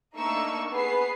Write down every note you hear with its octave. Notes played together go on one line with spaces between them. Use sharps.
A3 A#3 D4 D#4 C#6 E6
B3 G#4 B4 C7